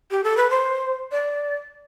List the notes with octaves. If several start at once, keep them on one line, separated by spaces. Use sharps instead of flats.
G4
A4
B4
C5
D5